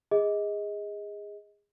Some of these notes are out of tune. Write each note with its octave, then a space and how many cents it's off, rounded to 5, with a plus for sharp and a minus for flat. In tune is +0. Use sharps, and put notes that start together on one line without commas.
G#4 -20 D#5 +20